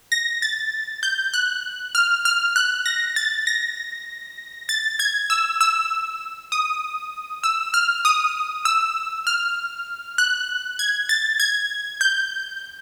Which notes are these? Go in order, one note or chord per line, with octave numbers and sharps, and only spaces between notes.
A#6
A6
G6
F#6
F6
F6
F#6
A#6
A6
A#6
A6
G#6
E6
E6
D#6
E6
F6
D#6
E6
F6
F#6
G#6
A6
G#6
G6